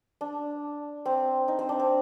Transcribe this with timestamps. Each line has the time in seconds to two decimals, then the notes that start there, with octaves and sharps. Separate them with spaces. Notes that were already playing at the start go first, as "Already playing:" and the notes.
0.21 D4
1.06 C4
1.48 D#4
1.59 C4
1.69 D4
1.79 C4